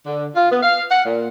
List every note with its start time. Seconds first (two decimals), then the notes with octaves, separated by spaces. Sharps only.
0.06 D3
0.35 F4
0.50 B3
0.62 F5
0.90 F#5
1.04 A#2